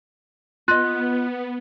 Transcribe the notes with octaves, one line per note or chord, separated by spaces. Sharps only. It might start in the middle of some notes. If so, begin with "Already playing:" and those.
B3 F4 D#5 F#6